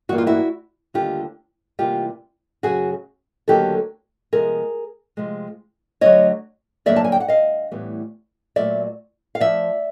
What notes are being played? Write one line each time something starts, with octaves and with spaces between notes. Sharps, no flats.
G2 E3 G3 A#3 F#4
F4
E4 F#4
D#2 D3 G3 F4 G4
C3 E3 G3 A#3 F4 G4
F#2 C#3 F#3 F#4 G#4
D#2 D3 F#3 A#3 G4 A4
C3 F3 G#3 B3 G#4 A#4
C3 F3 G#3
D2 D3 F#3 C#5 D#5
G2 D3 F#3 A#3 D5 E5
A5
G#5
G5
F#5
D#5 F5
A2 E3 G3 B3
A#2 F#3 A3 D5 E5
F5
F3 D5 E5